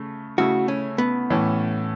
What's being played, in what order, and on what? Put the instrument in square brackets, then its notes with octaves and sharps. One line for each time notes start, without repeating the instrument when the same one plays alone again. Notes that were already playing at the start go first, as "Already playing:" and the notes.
Already playing: [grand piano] C#3 A3
[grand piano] C#3 A3 E4 [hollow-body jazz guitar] F#4
[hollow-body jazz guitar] C#4
B3
[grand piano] A2 E3 A3 C#4